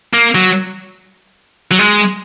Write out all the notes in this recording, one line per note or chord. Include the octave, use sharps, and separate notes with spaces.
A#3
F#3
F#3
G#3